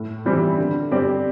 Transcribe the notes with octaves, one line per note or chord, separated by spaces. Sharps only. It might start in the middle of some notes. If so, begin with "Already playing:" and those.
Already playing: A2
E3 G3 C4 E4
D3
G3 C4 G4 D5